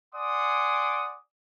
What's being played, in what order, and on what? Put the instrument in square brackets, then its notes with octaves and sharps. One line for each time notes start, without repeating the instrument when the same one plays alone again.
[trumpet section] D5 F#5 G#5 C6 D6 D#6